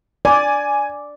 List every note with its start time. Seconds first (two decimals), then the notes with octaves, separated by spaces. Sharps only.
0.25 D5 G#5